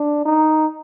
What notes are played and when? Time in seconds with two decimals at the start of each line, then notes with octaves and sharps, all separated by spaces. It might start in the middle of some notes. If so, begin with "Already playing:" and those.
Already playing: D4
0.25 D#4